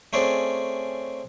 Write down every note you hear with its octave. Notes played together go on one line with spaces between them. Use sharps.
A3 C4 C#4 G#4 D5